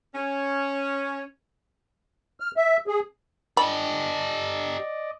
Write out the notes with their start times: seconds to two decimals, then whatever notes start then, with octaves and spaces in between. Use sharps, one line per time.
0.13 C#4
2.40 F6
2.57 E5
2.87 G#4
3.57 G4 A4 D5 D#5 B5